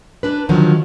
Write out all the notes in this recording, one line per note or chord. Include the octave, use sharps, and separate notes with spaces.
D4 B4
D3 D#3 F3 F#3